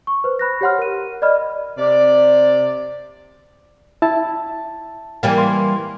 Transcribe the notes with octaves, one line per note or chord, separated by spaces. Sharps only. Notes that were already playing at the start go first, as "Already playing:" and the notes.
C#6
B4 C5
B5 F#6 A#6
G4 C#5 F#5 C6 F6
A#4 D#7
D5 D#5 B5 F6
C3 D5
E4 A5
E3 G3 A#3
C6